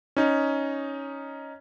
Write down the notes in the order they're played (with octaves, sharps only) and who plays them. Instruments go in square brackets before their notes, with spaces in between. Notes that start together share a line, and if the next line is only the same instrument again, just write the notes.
[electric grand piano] C#4 D#4